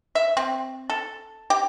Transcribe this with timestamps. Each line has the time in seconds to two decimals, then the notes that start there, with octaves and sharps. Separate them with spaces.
0.15 E5
0.37 C4
0.90 A4
1.50 G4